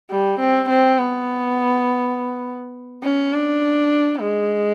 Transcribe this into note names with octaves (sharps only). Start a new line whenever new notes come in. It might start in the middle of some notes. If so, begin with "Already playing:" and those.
G3
C4
C4
B3
C#4
D4
G#3